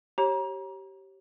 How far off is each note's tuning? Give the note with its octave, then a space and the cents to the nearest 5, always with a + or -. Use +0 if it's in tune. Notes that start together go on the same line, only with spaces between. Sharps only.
G4 -20 C#5 -30 A#5 +30